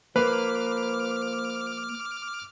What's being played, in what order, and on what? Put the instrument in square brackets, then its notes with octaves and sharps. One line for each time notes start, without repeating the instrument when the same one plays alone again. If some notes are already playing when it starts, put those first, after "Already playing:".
[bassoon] F3 [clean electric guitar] A#3 [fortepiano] B4 [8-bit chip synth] D6 F6